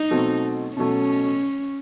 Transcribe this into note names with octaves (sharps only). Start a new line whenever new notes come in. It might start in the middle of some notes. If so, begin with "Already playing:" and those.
Already playing: D#4
B2 F#3 A3 C4
B2 F#3 A3 C#4